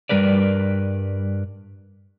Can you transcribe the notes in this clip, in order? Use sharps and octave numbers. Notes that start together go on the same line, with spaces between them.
G2 E3 G3 A#4 B4 D5